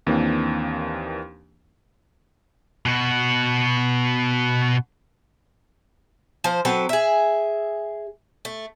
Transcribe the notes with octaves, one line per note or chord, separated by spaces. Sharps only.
D#2 E3 A#3 C4 D4
B2 F#4
F3 C5
F#3 C4 A4 B4
G#4 E5
A3